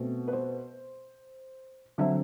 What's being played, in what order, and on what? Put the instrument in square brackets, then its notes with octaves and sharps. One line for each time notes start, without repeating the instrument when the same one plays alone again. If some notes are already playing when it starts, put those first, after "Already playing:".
Already playing: [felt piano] B2 A3 C4
B4
C5
D3 F#3 C4 E5